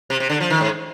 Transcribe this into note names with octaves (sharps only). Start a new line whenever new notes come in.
C3
C3
D3
F3
D#3
G#2